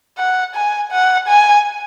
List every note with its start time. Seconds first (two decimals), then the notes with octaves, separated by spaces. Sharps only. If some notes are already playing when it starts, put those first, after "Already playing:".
0.18 F#5
0.55 G#5
0.92 F#5
1.28 G#5